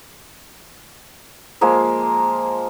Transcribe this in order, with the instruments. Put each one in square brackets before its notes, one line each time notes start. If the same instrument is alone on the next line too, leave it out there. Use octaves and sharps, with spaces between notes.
[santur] F3 G#3 A#3 A#4